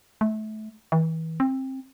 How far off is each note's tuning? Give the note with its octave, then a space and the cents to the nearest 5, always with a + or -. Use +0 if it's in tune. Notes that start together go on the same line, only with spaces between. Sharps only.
A3 -25
E3 -35
C4 +20